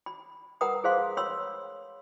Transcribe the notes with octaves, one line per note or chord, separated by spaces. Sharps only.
B5
A#4 B4 F#5 A#5 B5 D#6
G#4 C5 F5 C6
C#5 B5 C6 E6